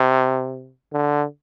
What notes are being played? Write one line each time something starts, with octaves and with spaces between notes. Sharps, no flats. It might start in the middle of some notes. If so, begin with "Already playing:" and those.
Already playing: C3
D3